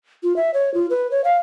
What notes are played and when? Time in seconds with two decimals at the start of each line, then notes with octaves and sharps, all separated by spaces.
0.23 F4
0.36 E5
0.54 C#5
0.74 F4
0.90 B4
1.11 C#5
1.24 F5